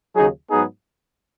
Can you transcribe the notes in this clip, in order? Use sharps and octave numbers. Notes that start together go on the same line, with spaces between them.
D#2 C#3 F#3 D#4 G#4
G#2 F#3 B3 D#4 G#4